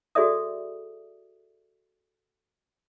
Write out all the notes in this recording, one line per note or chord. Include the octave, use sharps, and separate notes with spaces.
F#4 G#4 A4 D5 E5 D#6